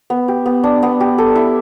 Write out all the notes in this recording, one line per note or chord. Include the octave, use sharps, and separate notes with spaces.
B3
G4
B3
D4
B3
G4
A4
E4